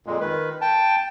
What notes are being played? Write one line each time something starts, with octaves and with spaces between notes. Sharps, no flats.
F2 A#2 G#3
D#3 B4
G5 A5